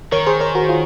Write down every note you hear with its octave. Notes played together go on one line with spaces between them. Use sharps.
D#3 A#4 C#5
G#4 C5
A#4 C#5
F#4 A#4
F4 G#4